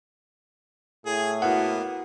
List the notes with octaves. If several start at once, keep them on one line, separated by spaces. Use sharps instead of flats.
A2 G#4
A#3 B3 E4 F#4 F#5